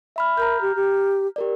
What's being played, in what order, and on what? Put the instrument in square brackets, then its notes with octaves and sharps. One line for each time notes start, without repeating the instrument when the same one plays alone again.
[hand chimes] E5 B5 F6
[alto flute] A#4 [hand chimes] A#5 F6 G6
[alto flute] G4
G4
[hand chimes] G4 A#4 D5